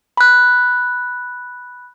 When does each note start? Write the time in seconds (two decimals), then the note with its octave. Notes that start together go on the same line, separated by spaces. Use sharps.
0.17 B5 F#6